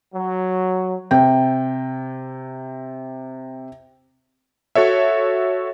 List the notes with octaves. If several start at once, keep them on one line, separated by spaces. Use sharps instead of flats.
F#3
C3 G5
F#4 A4 C#5 E5